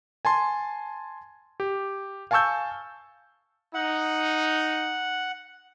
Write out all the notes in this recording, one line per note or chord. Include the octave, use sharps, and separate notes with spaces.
G#5 A5 C6
G4
F5 G#5 A5 C#6 E6 G6
D#4 F#5